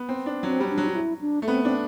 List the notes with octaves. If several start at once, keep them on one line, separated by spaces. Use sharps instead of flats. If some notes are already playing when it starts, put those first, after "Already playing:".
Already playing: B3
C4
D4
F#3 C4
G3
D4
F#3
F#4
E4
D4
A3
B3 C4
C4 D4